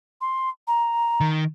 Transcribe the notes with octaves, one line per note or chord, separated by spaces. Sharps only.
C6
A#5
D#3